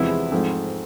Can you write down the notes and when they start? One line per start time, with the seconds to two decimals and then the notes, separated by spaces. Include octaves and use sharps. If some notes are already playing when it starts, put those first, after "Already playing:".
Already playing: E2 C3 F3 G#3 B3 E4
0.31 G#2 F3 A3 C4